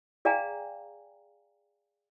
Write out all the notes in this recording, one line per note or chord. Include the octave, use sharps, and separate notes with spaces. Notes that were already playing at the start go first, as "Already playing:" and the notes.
G#4 D5 F5 G5 G#5 A#5